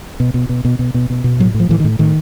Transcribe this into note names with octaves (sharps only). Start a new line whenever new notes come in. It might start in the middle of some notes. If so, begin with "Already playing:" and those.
B2
B2
B2
B2
B2
B2
B2
B2
A2 F#3
A2
F3
A2 E3
D#3
A2
A2 D#3